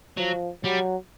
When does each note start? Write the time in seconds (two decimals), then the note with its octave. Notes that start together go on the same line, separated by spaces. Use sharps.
0.17 F3 F#3
0.64 F#3 G3